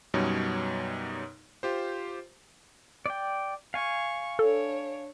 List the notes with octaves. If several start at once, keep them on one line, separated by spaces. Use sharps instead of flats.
F#2 B2 G3 D#4 C#5
F4 G4 C5
D5 G5
F5 G#5 C#6
D4 A4 C#5